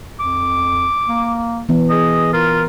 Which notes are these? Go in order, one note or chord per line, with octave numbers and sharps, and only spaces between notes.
F2 D6
A#3
E3 B3
G#4 D#5
F4 A#4